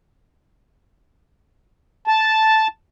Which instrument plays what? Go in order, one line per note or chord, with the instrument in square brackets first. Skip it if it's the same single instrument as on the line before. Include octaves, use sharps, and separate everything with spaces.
[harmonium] A5